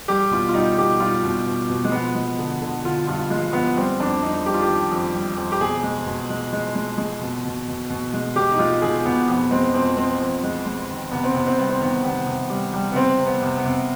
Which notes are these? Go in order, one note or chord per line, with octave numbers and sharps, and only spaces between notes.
G3 G4
B2 F4
F4
G3 D#4
B2 G4
G3 F4
B2
B2
B2
G#3
F3 B3
G#3
D3
D3
D3 F4
G2 F4
F3 G#3
F3 B3
G3 C4
F2 D4
F2 D#4
G3 G4
F4
G4
D#3
F2
G3
F2
G4
B2 G#4
G#3
B2
G#3
G#3
G#3
G#3
B2
B2
B2
B2
G#3
B2 G4
D#4
G#3 F4
B2 G#4
B2 B3
F2 B3
G#3 C4
F2 C4
G#3 C4
F2
G#3
G#3
D#3
C3 B3
C4
C3 B3
C4
G3 B3
C4
D#3 B3
C3 B3
C3
G3
G3
B3
C3 C4
C3
B3
C3
B3
C3